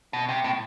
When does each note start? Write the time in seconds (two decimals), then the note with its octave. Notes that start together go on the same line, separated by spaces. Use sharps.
0.13 B2
0.29 C3
0.44 A2